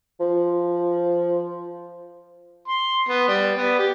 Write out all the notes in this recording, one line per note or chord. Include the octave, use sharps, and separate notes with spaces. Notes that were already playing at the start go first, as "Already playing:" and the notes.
F3
C6
B3
G3
B3
G4